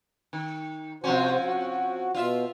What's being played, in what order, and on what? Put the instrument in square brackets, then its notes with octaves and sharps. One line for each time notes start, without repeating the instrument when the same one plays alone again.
[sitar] D#3
[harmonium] C3 F#4 C5 [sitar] F3 C4 C#4
[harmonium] F#4
[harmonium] B2 [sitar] F4 E5